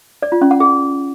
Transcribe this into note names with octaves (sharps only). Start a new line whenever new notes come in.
D5
F4
C#4
F#5
G#4